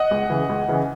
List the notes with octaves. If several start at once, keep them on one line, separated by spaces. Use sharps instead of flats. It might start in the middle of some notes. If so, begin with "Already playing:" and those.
Already playing: D#5 F#5
C#2
C#3 E3
C#2
C#3 E3